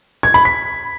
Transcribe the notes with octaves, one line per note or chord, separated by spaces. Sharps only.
G#6
B5
B6